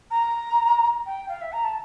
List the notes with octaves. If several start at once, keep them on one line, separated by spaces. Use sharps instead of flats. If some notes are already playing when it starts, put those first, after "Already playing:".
A#5
G5
F5
E5
A#5
A5